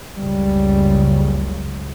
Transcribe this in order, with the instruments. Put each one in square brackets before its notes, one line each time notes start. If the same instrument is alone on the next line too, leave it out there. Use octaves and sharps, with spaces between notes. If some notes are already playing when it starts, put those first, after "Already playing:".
[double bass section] F#1 C#2 C#3 [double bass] G3